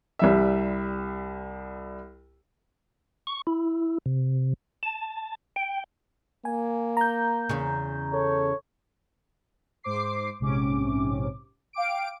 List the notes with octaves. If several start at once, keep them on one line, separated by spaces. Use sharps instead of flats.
C2 G3 E5
C#6
E4
C3
A5
G5
A#3 G#5
A#5 G6
E2 C#3
A4 C#5
G#2 C5 D6 C7
A#1 G#2 C3 C#4 D6
F5 G5 D6 D7